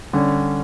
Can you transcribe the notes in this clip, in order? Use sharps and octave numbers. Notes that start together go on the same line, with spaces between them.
D3 G3 C#4